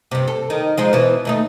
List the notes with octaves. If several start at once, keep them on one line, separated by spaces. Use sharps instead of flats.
G2 C3
A4
D#3
F3 G#3 D#4
B2 E3
D#2 A3 D#4